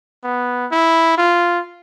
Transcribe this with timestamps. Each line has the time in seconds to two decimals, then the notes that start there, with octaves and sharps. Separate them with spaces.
0.24 B3
0.72 E4
1.18 F4